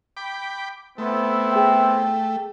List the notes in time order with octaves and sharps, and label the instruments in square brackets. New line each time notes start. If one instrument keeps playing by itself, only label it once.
[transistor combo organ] G5 B5 D6
[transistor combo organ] A3 [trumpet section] B3 C4 E4
[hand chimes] G#4 G5